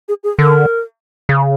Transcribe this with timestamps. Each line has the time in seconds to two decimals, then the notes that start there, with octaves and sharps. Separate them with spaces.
0.08 G#4
0.24 G#4
0.39 D3 A#4
1.29 C#3